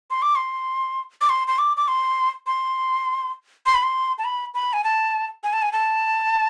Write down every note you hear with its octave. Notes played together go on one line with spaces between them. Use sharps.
C6
D6
C6
D6
C6
C6
D6
D6
C6
C6
C6
B5
C6
A5
B5
B5
G#5
A5
G#5
A5
G#5
A5